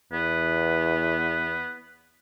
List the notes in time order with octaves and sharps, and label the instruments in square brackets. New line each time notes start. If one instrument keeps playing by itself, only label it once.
[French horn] E2 [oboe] B3